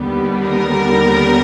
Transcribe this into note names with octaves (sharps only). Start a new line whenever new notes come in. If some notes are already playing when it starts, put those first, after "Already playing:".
Already playing: D#2 D3 G3 B3
A#4